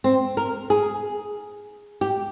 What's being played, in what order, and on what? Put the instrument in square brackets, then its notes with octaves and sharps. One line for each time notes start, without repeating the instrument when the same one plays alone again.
[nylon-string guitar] C4
A#4
G#4
G4